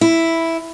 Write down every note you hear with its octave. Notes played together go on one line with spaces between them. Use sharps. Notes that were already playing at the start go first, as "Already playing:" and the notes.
E4